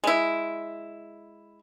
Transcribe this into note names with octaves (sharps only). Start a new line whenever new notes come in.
G#3 E4